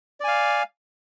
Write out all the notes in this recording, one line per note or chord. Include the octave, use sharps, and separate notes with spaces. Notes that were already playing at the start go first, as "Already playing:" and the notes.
D5 F5 G#5